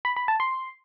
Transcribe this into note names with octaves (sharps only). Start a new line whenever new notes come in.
B5
B5
A5
C6